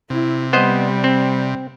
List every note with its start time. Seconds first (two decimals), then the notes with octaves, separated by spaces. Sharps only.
0.10 C3 E4
0.53 G3 B3 C5 D#5
1.04 C4